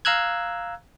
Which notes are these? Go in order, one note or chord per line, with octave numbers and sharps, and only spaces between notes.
F5 A#5 E6 F#6 G#6